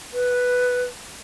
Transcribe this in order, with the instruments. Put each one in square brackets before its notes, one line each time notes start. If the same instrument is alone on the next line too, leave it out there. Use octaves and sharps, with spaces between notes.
[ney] B4